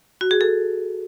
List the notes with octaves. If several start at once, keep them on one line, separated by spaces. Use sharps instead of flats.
F#4
G#4
A4